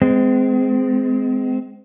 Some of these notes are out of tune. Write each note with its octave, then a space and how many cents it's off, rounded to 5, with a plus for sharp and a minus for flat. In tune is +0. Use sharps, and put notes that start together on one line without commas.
G#3 +15 C4 -30